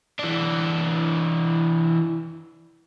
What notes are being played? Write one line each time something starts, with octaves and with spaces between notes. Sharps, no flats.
E3 D4